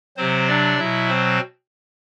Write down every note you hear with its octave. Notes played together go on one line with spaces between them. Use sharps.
C3 F#3 C4 C5
D4 D5
B2 F#3 E4 E5
C4 C5